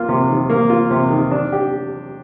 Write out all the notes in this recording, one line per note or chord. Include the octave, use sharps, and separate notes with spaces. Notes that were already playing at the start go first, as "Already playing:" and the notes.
Already playing: A#3 F4
C3
D#3
A#3
F4
C3
D#3
D4
G4